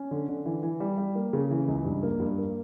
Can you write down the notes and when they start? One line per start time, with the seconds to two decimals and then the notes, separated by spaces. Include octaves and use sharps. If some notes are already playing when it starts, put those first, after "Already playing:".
Already playing: C#4
0.11 D3
0.29 D3
0.45 E3
0.63 E3
0.80 G3
0.98 G3
1.15 A#3
1.33 C#3
1.51 E3
1.68 C#2
1.85 G2
2.03 A#3
2.20 G2
2.38 A#3